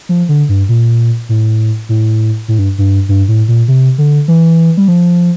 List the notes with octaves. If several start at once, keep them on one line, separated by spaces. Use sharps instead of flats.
F3
D3
G2
A#2
A2
A2
A2
G2
G2
G2
A2
A#2
C3
D3
E3
G3
F3